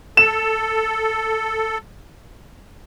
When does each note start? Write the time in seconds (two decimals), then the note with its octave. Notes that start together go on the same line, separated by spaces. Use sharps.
0.17 A4 E7